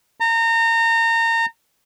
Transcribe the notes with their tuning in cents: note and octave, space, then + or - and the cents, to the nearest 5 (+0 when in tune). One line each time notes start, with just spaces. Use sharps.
A#5 -30